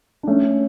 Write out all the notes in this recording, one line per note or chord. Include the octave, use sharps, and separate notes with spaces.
D4
A3 C#4